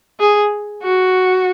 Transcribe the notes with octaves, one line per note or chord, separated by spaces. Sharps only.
G#4
F#4